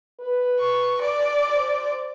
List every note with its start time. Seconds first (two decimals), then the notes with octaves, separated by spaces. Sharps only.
0.21 B4
0.59 C#6
1.01 D5
1.55 C5